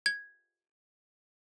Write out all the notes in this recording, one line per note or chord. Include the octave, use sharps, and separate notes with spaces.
G#6